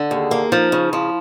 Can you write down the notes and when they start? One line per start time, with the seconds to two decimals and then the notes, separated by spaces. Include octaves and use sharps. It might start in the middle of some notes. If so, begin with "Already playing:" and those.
Already playing: D3
0.11 D#2 G#4
0.31 A#3
0.52 F3 D#4
0.72 C#3
0.93 F3 E4